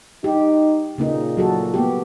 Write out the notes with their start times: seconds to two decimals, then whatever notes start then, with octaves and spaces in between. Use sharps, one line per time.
0.24 D#4 G4
0.98 A#2 C#3 A#3 D#4
1.37 F#3 F#4 A4
1.74 A#3 B3 G4